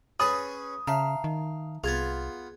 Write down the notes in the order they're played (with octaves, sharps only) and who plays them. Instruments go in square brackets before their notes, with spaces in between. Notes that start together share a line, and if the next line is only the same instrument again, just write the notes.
[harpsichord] C#4 G#4 B4 [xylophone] B5 A6 [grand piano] D#6
[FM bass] C#3 [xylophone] E5 A5 A#5 [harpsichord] F5
[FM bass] D#3
[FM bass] C2 [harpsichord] B3 F4 [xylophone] G#4 G#6 A6